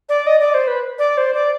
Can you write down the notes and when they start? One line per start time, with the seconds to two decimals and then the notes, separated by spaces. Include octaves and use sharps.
0.09 D5
0.27 D#5
0.40 D5
0.54 C5
0.68 B4
0.99 D5
1.17 C5
1.34 D5